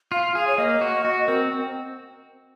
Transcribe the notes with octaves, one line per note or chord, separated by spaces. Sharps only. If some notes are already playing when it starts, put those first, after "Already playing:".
F4 F5
G#4 F5
C#5
A#3 D#5
F#4
F#4
C4 A#4